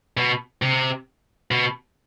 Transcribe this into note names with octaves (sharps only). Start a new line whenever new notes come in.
B2
C3
B2